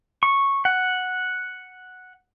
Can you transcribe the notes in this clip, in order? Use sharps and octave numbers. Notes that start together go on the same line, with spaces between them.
C#6
F#5